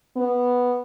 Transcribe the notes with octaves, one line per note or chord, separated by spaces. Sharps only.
B3